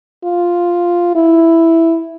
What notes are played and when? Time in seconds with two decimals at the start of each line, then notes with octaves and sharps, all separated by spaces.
0.24 F4
1.15 E4